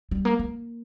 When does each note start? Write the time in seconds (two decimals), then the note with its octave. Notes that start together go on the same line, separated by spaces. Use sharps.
0.11 G3
0.25 A#3
0.39 A#3